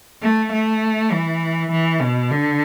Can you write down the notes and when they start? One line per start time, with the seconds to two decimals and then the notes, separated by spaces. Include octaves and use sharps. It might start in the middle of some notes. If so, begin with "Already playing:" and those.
0.22 A3
0.52 A3
1.12 E3
1.72 E3
2.01 B2
2.31 D3